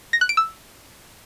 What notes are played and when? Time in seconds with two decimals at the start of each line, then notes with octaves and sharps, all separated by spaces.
0.13 A#6
0.21 F#6
0.29 D7
0.37 E6